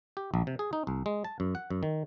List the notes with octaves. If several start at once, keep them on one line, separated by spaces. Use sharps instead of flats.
G4
A#1
C3
G#4
D#4
C2
G#3
A5
F#2
F#5
F#2
D#3